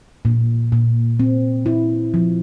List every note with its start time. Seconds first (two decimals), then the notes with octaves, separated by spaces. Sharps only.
0.25 A#2
0.72 A#2
1.20 C4
1.66 E4
2.14 F3